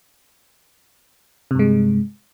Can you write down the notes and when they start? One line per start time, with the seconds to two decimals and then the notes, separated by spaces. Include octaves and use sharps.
1.51 C3
1.55 G2
1.59 G#3